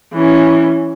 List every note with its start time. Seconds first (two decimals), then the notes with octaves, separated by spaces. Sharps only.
0.13 E3 C#4